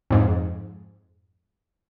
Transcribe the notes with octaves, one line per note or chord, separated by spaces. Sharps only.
F2 G#2